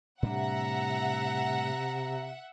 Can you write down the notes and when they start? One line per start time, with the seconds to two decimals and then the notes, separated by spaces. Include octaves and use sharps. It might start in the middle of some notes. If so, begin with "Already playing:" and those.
0.23 A2 C3 G3 D4 E5 F#5 A#5